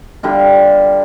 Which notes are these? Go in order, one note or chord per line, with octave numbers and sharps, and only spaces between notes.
D3 G3 F4